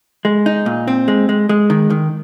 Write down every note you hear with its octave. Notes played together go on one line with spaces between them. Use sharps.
G#3
D#4
A#2
C4
G#3
G#3
G#3
D#3
D#3